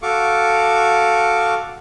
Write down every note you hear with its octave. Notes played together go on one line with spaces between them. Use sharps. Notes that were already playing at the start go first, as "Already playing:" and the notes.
F#4 A4 F5 C#6 D6